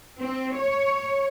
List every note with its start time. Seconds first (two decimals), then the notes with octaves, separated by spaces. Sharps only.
0.18 C4
0.54 C#5